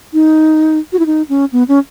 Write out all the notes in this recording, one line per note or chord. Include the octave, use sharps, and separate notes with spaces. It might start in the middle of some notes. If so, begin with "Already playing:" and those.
D#4
F#4
E4
D#4
C#4
B3
C#4